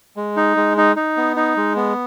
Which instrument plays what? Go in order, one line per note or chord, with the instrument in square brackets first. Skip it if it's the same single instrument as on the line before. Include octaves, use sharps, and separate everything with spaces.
[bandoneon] G#3
D#4
G#3
D#4
D#4
B3
D#4
G#3
B3